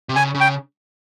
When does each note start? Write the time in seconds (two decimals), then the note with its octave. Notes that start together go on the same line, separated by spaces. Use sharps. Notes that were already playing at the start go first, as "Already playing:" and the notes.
0.09 C3
0.16 C#3 G#5
0.34 C#3
0.41 G5